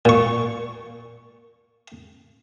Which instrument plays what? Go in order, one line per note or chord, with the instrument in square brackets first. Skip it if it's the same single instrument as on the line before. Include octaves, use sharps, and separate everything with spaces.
[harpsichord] A#2 C#6